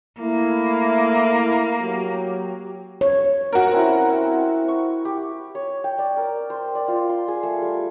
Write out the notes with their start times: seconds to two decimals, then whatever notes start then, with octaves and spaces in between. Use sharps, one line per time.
0.20 A3 A#3 E4
1.81 F#3 G4
3.01 C#5
3.53 F#4 A#4
3.71 C4 C#4 E4
4.10 C4
4.68 C#6
5.05 G4
5.55 C#5
5.84 G5
5.99 D5
6.17 A#4
6.50 C5
6.75 D5
6.88 F4
7.09 C6
7.28 G#4
7.43 A3
7.62 G3